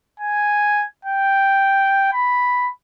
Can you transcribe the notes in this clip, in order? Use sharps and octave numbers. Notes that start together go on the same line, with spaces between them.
G#5
G5
B5